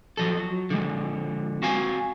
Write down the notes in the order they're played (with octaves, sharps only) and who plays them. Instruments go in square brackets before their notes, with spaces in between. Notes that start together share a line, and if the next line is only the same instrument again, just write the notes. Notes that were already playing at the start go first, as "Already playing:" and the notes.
[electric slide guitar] F3 F#3 A4
F#3
D3 F3 G#3
C4 F#4 F5 G#5